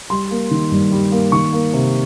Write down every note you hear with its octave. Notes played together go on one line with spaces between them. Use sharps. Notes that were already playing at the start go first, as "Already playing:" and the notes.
G3 C6
A#3
D#3
G2
G3
A#3
D#3 C#6
A#3
C3